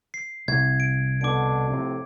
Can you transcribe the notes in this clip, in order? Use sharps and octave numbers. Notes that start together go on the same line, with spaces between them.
C7
C2 G#6
D7
B2 D3 D4 D6 D7
F2 A2 C3